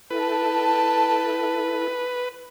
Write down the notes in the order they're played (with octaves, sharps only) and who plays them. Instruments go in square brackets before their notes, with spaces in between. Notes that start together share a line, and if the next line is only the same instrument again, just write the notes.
[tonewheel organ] E4 A4 [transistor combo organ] B4 [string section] G5 A5